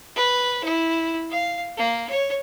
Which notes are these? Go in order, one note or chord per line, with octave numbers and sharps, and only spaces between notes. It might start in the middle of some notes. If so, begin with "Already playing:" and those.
B4
E4
F5
A#3
C#5